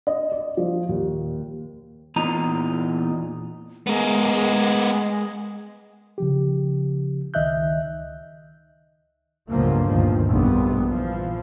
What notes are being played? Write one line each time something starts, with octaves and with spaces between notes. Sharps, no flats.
D#5
D5
F3
D#2
E2 A#2 D#4 A#5
G#3 B3 A#4
C#3 F3 G4
C#2 D#3 D#5 E5 F#6 G6
G1 C#2 A#2 F3 F#3 A#3
G1 D2 D#3 F3
A#1 F2 G3 B3
E3 F3